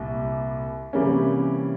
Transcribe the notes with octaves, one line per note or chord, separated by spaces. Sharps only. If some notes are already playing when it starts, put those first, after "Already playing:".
Already playing: C2 A#2 G3
C3 E3 G3 A#3 C#4